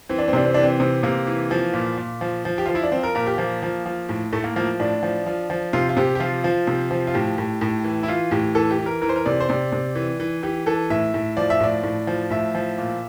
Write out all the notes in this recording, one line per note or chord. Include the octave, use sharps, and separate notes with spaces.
E3 C4
D4
C4
C3 D4
C4
E3 D4
C4
C3
C3 A#3
E3
F3
A#2
A#2
F3
F3
G4
F3 F4
E4
D4
F3 C4
A#4
A#2 A#4
G4
F3 A#3
F3
F3
A2
A2 A3
A#3
F3 A#3
A2 D4
F3
F3
F3
C3 F4
F4
C3 G4
G4
F3 F4
F3
C3
F3
F4
A2 G4
A2
A2
E3
E4
E3 F4
A2 G4
E3 A4
G4
E3
A#4
E3 A#4
C5
A#4
C3 D5
C5
C3 D5
C3
E3
E3
E3 G4
E3 A4
A2 E5
A2
F3 D5
E5
A2 D5
A2
F3
A2 E5
F3
A#2